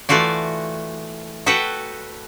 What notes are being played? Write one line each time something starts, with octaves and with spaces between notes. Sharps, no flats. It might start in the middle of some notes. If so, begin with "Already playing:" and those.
E3 A3 F4 F#4 D5
F#4 A4 B4 F#5 G5